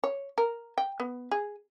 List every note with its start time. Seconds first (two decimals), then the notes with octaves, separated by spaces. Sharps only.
0.04 C#5
0.38 A#4
0.78 G5
1.00 B3
1.31 G#4